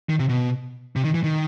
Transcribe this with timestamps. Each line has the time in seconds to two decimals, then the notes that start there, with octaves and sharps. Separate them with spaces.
0.09 D#3
0.19 C3
0.29 B2
0.96 C3
1.04 D#3
1.14 E3
1.24 D#3